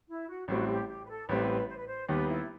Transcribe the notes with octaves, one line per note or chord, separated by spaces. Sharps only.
E4
F#4
A1 A2 G3 C4 F#4
G4
G4
B4
A4
A1 A2 G3 C4 B4
C5
B4
C5
D#2 D#3 G3 B3 B4
E4